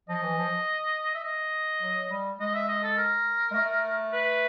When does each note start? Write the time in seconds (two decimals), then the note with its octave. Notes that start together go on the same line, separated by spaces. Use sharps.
0.09 F3 D#5
0.24 E3
0.38 F3
1.14 E5
1.24 D#5
1.82 F#3
2.10 G3
2.40 G#3 D#5
2.54 E5
2.68 D#5
2.83 A4
2.97 A#4
3.51 G#3
3.55 A3
4.13 B4